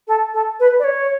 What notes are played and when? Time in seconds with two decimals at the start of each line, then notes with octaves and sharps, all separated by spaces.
0.07 A4
0.33 A4
0.59 B4
0.79 D5
0.84 C#5